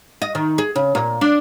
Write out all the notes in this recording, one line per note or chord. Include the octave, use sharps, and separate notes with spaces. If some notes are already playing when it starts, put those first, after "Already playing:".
D#5
D#3
G#4
C#3
A#2
D4